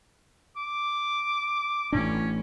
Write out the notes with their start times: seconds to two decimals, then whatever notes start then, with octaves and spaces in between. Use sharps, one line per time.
0.57 D6
1.92 A1 A2 C#4 D4